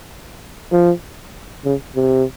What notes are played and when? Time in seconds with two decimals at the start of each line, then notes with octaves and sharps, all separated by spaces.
0.72 F3
1.65 C#3
1.96 C3